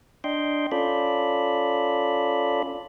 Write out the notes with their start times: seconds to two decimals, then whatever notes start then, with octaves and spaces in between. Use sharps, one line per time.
0.24 D4 D#5 G5 C6
0.72 C#4 F4 A4 D5 B5